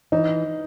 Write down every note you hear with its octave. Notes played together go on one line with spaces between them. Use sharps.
E3 D#4